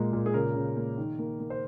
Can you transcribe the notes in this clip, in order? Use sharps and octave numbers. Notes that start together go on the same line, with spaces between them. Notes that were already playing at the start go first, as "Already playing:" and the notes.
Already playing: A#2 G#3 A#3
A#2
G#4
C#3 A#4
C#3
A#3
D#3
A#3
A#3
C5